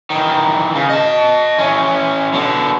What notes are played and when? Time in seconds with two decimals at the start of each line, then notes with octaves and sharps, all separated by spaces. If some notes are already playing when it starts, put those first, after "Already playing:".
0.10 D#3 E3
0.75 C#3
0.89 D#5 A5
1.58 E3 C#4
2.33 B2 D3